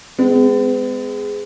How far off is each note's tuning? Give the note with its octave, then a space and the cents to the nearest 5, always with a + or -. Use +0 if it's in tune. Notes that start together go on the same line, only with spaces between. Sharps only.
G#3 +0 B3 +45